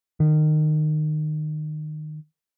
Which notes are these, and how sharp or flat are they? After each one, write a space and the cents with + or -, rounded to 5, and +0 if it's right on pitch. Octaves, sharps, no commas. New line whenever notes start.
D#3 -25